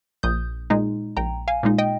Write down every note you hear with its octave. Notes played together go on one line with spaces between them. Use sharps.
A#1 D#6 G6
A#2 G#3 D#4
A#1 G5 A#5
F5 G#5
A#2 G#3 D#4
D#5 G5